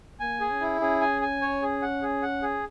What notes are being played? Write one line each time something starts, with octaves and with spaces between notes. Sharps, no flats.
A#3 G#5
G#4
C#4
E4
C#4 G#4
G#5
G#5
C#5
G#4
F#5
G#4
F#5
G#4